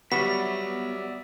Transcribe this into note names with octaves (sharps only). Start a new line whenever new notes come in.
F#3 G3 B3 D5 E5 B6